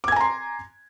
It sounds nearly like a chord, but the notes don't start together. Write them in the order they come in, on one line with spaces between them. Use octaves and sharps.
D6 G#6 G#5 A#5 C6